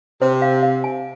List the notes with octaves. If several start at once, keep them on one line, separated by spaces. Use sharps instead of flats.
C3 C5
F5
F5
G#5